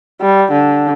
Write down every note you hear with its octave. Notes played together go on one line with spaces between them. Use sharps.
G3
D3